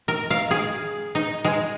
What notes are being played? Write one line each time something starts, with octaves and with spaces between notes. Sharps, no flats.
A#4
F5
G#4
D#4
G#3